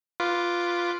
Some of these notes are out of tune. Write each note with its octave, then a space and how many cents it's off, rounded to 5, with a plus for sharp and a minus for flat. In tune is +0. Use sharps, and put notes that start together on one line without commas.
F4 +0 B4 +0 D6 +0